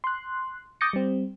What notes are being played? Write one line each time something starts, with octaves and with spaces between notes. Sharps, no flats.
C6 F#6
D6 D#6 G6 A6 A#6 C#7
G3 C4